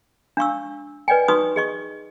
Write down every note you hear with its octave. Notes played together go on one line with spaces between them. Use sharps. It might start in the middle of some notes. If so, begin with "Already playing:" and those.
D4 F5 C#6 E6
B4 D5 D#5 G5 G#5
D#4 F#4 B4 C#6 D#6
G#4 D#5 C#6